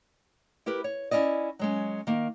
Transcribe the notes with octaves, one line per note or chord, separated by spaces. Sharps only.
E4 G4 A#4 B4
C#5
C#4 E4 D5 D#5
F#3 G#3 C#4
D#3 A#3